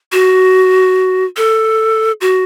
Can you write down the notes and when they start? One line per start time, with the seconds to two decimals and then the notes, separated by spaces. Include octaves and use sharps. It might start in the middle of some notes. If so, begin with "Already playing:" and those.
0.12 F#4
1.37 A4
2.21 F#4